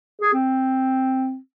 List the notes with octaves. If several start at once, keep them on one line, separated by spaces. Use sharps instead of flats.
G#4
C4